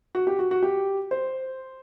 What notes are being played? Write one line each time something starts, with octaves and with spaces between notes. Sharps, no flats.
F#4
G4
F#4
F#4
G4
C5